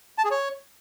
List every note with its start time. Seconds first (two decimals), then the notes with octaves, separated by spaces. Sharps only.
0.18 A5
0.25 G#4
0.31 C#5